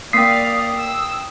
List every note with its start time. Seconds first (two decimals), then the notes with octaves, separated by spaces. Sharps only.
0.13 A#3 D5 F5 G5 D#6 B6 C7
0.78 E6